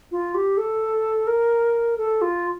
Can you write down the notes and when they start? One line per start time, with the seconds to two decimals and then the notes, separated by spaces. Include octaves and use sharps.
0.11 F4
0.35 G4
0.57 A4
1.27 A#4
1.98 A4
2.22 F4